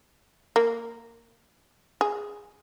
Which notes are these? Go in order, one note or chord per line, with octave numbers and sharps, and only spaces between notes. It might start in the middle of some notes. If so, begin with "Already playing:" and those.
A#3
G#4